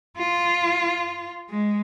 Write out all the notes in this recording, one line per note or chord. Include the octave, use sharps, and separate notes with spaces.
F4
G#3